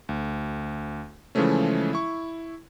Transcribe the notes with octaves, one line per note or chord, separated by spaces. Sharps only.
D2
C#3 E3 F3 G#3 A3 C#4
E4 C#6